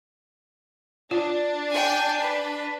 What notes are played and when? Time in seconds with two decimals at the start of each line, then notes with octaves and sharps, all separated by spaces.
1.11 D4 F4
1.70 G5 G#5
2.20 B4